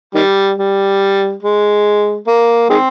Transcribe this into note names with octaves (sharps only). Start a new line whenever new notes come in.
D#3 G3
G3
G#3
A#3
D#3 G#3 C4